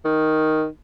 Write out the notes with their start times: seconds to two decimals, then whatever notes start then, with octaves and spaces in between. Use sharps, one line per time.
0.05 D#3